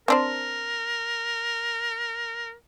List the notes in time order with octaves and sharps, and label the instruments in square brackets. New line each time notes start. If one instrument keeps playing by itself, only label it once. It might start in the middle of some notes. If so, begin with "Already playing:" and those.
[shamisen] C4 D4 C5 [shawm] A#4